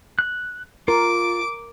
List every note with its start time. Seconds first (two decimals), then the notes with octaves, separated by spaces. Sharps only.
0.19 F#6
0.88 F4 A#4 D6